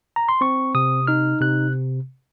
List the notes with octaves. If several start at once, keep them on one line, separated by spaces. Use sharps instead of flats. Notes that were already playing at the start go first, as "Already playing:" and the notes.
A#5
C6
C4 C#6
C3 D#6
D#4 F6
C3 F#6